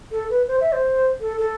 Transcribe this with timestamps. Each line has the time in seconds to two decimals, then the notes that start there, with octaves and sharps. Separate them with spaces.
0.12 A4
0.30 B4
0.48 C5
0.61 E5
0.72 C5
1.20 A4
1.38 A4